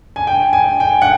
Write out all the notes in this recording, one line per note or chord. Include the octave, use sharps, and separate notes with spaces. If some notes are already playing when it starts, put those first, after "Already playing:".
G#5
G5
G#5
G5
F#5